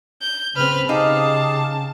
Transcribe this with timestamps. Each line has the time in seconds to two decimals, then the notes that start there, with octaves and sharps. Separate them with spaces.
0.22 G6
0.56 C#3 C4 B4 F6
0.89 C#3 D#4 G4 G#4 F5 A5